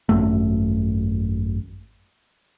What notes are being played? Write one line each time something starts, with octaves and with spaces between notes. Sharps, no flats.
G#1 F#2 A3